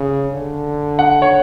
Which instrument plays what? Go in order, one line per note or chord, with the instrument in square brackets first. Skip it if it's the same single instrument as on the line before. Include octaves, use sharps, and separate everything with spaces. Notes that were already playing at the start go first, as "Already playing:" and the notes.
Already playing: [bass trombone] C#3
D3
[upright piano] F#5
C#5